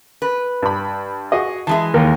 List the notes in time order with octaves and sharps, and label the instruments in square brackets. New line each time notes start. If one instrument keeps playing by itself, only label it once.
[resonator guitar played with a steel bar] B4
[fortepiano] G2 B5
F#4 G#4 D#5
[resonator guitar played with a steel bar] E3 G#3 G#4 [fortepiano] E5 A5
[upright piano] D#2 [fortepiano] A#4